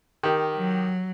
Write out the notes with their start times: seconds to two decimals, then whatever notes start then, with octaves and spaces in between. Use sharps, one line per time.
0.23 D#3 G4
0.56 F#3